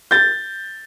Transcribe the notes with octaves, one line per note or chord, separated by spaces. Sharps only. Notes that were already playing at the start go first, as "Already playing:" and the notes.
G6 A6